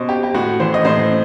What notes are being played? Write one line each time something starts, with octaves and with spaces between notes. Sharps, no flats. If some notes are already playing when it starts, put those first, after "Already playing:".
Already playing: B2 C5 D#5
G4
G4
A2 F#4
E3 C5
D#5
A2 C5